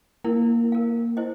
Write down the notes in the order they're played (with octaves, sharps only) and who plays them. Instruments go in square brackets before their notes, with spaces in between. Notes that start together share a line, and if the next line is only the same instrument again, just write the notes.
[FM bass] A#3 [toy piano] E4 A#4
[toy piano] A#4 F5
E4 C5 D#5